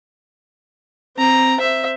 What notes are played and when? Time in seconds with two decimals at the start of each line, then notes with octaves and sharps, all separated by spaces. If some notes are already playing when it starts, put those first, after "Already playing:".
1.17 C4 A#5
1.59 C5 E5